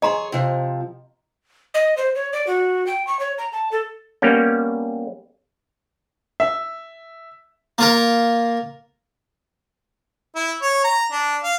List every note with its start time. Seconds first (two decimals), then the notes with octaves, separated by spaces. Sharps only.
0.02 G#4 C#5 D#5 A#5 C6
0.32 C3 F3
1.74 D#5
1.97 C5
2.15 C#5
2.33 D5
2.47 F#4
2.87 G5
3.07 C#6
3.19 C#5
3.38 A#5
3.52 A5
3.72 A4
4.22 G3 A#3 B3 C#4
6.40 E5
7.78 A#3 F4 A#4
10.36 E4
10.62 C#5
10.84 A#5
11.12 D4
11.43 F5